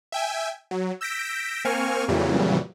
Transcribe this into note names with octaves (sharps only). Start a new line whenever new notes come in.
E5 G5 G#5
F#3
E6 G6 A#6 B6 D7
A#3 C4 G#5 C#6 F6
F2 A#2 C#3 E3 F#3 G3